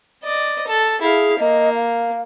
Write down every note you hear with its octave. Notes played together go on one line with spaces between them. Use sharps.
D5 D#5
A4
E4 G#4 F5
A#3 D#5
F5